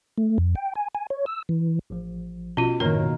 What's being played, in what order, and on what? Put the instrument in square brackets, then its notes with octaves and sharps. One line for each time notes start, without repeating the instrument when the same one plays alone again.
[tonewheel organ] A3
F2
G5
G#5
G#5
C#5
E6
E3
[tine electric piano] A1 F3
[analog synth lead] B2 [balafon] C#4 F4
[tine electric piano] F#2 A2 C#5 [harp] D#3 A#3 [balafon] A#4